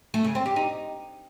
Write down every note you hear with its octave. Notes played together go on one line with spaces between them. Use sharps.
A3
C#3
C4
G4
D#4